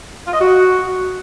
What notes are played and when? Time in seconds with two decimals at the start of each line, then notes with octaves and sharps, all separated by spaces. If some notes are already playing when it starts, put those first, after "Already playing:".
0.27 F4
0.33 D#5
0.40 F#4